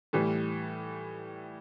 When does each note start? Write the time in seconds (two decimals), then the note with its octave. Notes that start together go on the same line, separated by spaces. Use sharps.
0.13 A2 E3 G3